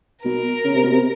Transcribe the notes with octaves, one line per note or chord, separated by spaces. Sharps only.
B2 A#4
C#3
C3
B2
C3